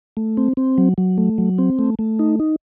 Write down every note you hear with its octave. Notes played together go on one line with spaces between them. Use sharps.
A3
C4
C4
F#3
F#3
A3
F#3
C4
A3
A3
D#4
D#4